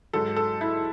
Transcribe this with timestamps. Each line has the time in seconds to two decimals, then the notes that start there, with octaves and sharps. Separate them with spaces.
0.13 G#2 F#3 A4
0.36 A4
0.61 E4